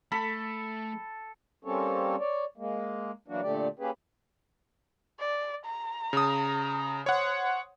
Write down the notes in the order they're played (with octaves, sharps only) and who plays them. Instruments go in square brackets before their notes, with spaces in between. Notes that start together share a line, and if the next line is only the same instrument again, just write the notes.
[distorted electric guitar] A3 [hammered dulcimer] A4 [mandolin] B5
[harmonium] G3 A#3 C4 C#4 A4 C#5
C#5 D5
G#3 A#3
E3 F#3 A#3 B3 D4 F#4
A#2 D3 A3 G4 D5
A#3 C#4 G4 G#4 B4
[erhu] D5
A#5
[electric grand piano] C#3 D#6
[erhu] C5 [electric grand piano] C#5 F#5